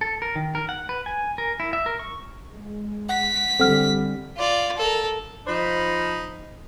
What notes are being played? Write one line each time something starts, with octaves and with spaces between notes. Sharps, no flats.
A4
A#4
D#3
A#4
F#5
B4
G#5
A#4
E4
E5
A#4
C#6
G#3
F#5 B6
D3 G3 C4 A4 F#5 F6
F4 D5
A4 A#4
F3 D#4 C5 B5